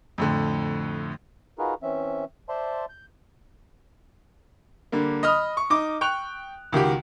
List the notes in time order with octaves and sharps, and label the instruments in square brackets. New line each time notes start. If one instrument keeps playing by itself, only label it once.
[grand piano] F2 A2 D3
[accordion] D#4 F4 F#4 G#4 A#4 B4
E3 C4 C#4 E5
C5 D5 E5 A5 C6
G6
[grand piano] D3 G3 A#3
D#5 B5 D#6 F6
C#6
D#4 D6
G5 C#6 F#6 F7
C#2 D#3 F#4 G4